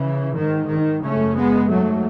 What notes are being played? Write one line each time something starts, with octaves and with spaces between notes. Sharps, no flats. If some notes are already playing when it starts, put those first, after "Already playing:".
Already playing: C#3 E3
G#2 D#3
D#3
F#2 C#3 A3 C#4
G#3 B3
G#2 F#3 A3